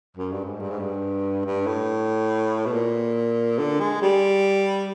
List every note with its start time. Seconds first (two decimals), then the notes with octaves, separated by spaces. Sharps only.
0.17 F#2
0.32 G2
0.45 G#2
0.60 G2
0.71 G#2
0.80 G2
1.45 G2
1.66 A2
2.66 B2
2.73 A#2
3.59 D3
3.80 G#3
4.02 G3